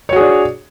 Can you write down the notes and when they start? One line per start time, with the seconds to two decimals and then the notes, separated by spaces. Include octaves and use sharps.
0.09 C#5
0.13 F#4
0.16 G#4
0.20 D4